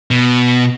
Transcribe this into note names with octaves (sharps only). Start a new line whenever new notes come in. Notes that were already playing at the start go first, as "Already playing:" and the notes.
B2